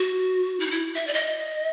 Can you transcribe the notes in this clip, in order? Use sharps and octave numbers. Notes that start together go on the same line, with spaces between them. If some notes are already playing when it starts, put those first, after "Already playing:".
Already playing: F#4
E4
D#4
E4
E5
D5
D#5